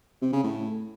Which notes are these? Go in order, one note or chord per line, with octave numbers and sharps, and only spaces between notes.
C3
C#3
A2